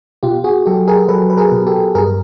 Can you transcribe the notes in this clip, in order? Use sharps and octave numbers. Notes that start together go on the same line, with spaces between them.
B2 F4 G4
F#4 G#4
F#3 G4 A4
G#4 A#4
F#3 A4 B4
B4
G#4 A#4
B2
G4 A4
G2 G#4 A#4